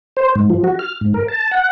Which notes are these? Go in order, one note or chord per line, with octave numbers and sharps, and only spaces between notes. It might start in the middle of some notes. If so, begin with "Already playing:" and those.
C5
G#2
F3
F#4
F6
G#2
A#4
A5
F#5